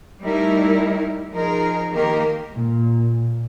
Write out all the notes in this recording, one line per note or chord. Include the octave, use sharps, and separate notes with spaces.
G3 A3 D#4 E4 A#4
F3 D#4 G#4 A#4
D#3 A#3 G4 A#4
A#2